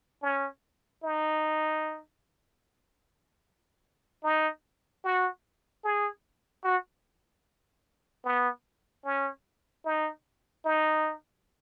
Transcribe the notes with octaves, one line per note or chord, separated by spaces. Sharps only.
C#4
D#4
D#4
F#4
G#4
F#4
B3
C#4
D#4
D#4